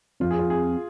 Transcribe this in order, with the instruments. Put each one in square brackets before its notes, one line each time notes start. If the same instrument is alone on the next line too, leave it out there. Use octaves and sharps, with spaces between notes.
[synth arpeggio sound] F2 F3 C4 [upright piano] F4
[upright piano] G#4
F4
G#4